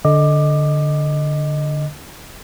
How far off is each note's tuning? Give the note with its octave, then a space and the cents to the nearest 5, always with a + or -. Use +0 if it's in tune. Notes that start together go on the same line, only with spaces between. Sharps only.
D3 +0 D#5 +0 D6 +15